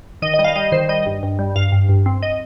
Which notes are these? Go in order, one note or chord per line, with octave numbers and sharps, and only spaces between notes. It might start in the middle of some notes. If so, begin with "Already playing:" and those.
D#3 D#5
D#5
G3
F5
G3 D#5
D#3 C5
G3 D#5
G2
G2
G3
G2 F5
G2
G2
C4
D#5